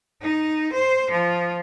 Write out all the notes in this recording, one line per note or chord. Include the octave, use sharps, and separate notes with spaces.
D#4
C5
F3